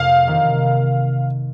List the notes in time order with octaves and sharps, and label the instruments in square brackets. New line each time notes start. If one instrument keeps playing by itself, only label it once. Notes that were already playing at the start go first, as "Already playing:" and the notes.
Already playing: [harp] F2 C3 A#3 [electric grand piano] F5
[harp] C3 D#3 A#3